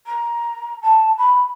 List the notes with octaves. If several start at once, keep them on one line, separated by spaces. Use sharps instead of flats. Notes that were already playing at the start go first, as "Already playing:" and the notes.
A#5
A5
B5